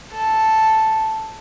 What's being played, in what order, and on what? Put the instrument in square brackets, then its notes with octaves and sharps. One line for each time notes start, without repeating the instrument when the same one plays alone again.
[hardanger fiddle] A4